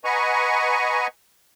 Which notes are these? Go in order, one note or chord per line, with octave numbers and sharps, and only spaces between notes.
B4 D#5 F#5 G#5 A#5 C#6